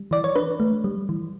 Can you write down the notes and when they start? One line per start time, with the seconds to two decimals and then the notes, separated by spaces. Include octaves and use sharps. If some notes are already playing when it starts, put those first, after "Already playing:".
Already playing: G3
0.11 E3 D5
0.24 C#5
0.35 D4 B4
0.60 A3
0.84 G3
1.09 E3